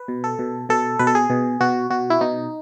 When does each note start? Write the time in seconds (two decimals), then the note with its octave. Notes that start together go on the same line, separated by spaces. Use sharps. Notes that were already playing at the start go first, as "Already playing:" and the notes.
Already playing: B4
0.08 B2
0.24 A4
0.39 B2
0.69 B2 A4
0.99 B2 B4
1.07 A4
1.15 G#4
1.30 B2
1.61 B2 F#4
1.90 B2 F#4
2.10 E4
2.21 B2 D#4